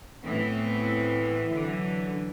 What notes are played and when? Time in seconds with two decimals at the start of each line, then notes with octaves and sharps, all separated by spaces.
0.23 A2 E3 B3 C4 E4
1.52 D3 E3 F#3